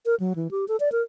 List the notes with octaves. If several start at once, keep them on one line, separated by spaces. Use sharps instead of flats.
A#4
F#3
E3
G4
A4
D5
A#4